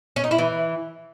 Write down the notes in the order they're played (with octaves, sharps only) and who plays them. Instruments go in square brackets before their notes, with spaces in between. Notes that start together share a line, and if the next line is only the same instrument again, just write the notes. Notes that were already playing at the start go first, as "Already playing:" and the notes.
[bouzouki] C#4
D#4
E4
E3